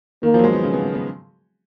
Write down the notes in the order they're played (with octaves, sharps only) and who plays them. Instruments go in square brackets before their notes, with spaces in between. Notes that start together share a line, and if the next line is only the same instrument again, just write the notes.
[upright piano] D#3 [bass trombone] A#3
[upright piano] F3
F#3
G#3
B3
C#3
B3
B3
B3